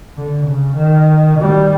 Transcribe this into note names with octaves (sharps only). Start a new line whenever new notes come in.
D3
C#3
D#3
D#3 G3